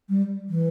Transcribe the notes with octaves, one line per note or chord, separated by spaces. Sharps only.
G3
E3